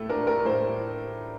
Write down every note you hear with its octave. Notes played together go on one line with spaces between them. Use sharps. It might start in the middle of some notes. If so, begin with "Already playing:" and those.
Already playing: A2 A3 A4
D4 A#4
A#4
A2 C5